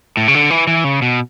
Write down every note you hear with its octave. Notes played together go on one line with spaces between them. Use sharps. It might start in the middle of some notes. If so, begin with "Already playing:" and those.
A2
C#3
D3
E3
E3
C#3
B2